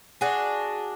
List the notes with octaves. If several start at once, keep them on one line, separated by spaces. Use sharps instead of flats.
D4 F#4 G#4